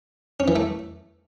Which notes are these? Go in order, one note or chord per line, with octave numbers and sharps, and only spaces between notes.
C#4
E3
A3